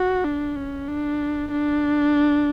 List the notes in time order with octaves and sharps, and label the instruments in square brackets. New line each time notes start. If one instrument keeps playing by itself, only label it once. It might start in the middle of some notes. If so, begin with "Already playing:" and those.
Already playing: [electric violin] F#4
D4
C#4
D4
D4